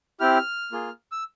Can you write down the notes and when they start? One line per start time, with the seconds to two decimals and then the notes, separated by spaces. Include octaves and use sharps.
0.20 C4 E4 G4 F6
0.72 A#3 F4 G#4
1.12 E6